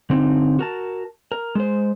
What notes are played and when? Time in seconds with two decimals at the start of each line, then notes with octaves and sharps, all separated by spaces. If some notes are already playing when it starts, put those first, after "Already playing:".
0.10 D3 C4 D#4
0.59 F#4 A#4 A5
1.32 A#4
1.55 G#3 C5